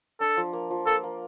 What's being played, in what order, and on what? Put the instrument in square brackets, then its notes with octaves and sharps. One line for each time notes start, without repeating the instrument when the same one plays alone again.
[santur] D4 [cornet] A4
[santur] F3
A#3
F3
[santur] A#3 [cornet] A4
[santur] A#3